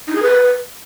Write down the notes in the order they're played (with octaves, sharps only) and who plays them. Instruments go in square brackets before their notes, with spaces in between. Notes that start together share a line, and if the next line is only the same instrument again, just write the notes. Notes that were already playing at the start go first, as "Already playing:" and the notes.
[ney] D#4
G#4
B4